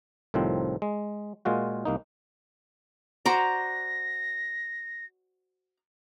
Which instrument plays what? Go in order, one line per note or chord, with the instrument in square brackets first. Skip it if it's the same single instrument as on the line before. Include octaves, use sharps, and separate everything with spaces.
[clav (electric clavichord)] C2 A2 D#3 F3 C4
G#3
A#2 G#3 F4 F#4
C2 A#3 D#4
[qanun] F#4 C5 D5 [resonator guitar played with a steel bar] A#5 [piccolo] A#6